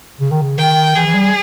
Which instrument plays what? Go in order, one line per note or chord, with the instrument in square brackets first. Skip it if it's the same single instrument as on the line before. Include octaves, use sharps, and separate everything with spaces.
[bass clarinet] C#3
D#3
C#3
[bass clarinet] D#3 [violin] G5
[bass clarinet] E3 [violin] G#4
[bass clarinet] E3
G3